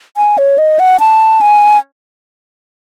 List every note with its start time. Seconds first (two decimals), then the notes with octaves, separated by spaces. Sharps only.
0.17 G#5
0.38 C#5
0.58 D#5
0.79 F#5
1.00 A5
1.41 G#5